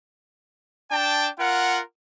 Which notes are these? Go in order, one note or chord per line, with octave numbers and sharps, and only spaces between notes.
D4 G5 A5
F4 A#4 F#5